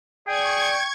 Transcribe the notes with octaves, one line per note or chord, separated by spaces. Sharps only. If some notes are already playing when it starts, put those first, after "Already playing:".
G#4 D5 G5 C#6 G#6